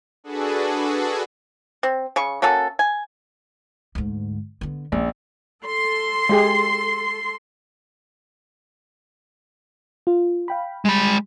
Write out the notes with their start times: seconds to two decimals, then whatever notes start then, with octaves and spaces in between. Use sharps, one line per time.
0.24 D4 F#4 G#4 A4 B4
1.83 C4
2.16 C#3 C#6
2.42 A#3 C#4 F#4 A4
2.79 G#5
3.95 D2 G#2
4.61 D3 B3
4.92 A#1 C#4
5.64 A4 C6
6.29 G#3 G4 G#4
10.07 F4
10.48 F5 G5 B5
10.85 G3 G#3 B5